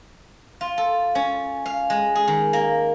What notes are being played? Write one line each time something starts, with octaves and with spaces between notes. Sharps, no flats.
F4
A4
C#4
F5
G#3
G#4
D#3
A#3